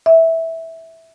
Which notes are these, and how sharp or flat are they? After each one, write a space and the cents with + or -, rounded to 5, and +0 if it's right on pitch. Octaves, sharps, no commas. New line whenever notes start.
E5 -10